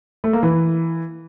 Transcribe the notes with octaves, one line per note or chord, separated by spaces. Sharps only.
A3
A#3
E3